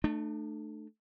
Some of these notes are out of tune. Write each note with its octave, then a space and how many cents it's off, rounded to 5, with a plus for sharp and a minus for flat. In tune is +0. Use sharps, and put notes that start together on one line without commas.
A3 +0 D4 +45